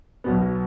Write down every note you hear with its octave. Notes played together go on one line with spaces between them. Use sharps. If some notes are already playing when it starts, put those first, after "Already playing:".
B1 B2 B3